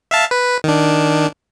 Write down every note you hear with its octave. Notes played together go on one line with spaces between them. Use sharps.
E5 F5 A5
B4
D#3 D4